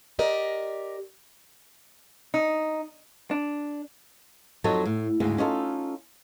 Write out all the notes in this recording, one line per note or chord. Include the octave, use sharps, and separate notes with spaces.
G4 A#4 D5 D#5
D#4
D4
F2 F#3 D#4 A4 C5 C#5
A2
D2 G#2 C#3
C#4 D#4 F4 A4